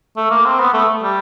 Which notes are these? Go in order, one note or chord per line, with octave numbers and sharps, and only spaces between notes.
A3
A#3
C4
B3
A3
G3